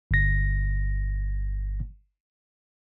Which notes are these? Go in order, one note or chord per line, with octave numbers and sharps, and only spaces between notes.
G1 A#6